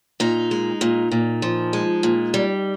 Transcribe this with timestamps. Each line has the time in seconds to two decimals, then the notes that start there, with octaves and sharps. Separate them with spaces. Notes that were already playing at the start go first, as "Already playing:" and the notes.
0.20 A#2 D#4
0.51 G#3
0.81 A#2
1.11 A#2
1.42 F3
1.73 G#3
2.03 A#2
2.34 G3